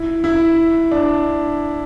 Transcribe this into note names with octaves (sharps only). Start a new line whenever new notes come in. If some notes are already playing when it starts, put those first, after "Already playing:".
Already playing: E4
E4
D4